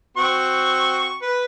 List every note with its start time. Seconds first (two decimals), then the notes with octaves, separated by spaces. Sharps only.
0.17 C4 F#4 C#6
1.22 B4